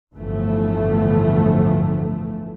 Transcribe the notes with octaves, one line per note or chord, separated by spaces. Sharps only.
G1 D2 A2 E3 F3 A3